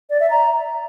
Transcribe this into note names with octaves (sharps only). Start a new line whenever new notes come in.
D5
E5
A#5